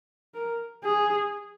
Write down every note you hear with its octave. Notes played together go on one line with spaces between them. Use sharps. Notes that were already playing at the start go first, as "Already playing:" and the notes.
A#4
G#4